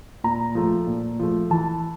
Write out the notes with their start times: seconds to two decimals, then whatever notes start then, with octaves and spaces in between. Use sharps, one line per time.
0.24 A#2 A#5
0.55 F3 A3
0.87 A#2
1.19 F3 A3
1.50 E3 A5